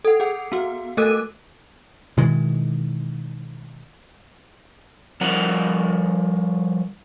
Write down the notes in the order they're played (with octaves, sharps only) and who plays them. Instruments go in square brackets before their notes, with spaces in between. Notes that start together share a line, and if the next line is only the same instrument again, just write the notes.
[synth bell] A4 F#5
G#4 F#5
B3 F#4
A3 A4 A#4 D6 F#6 D#7
[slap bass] B2 D#3 E3 G#3
[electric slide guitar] F3 G3 A#4 D5 F#5 A#5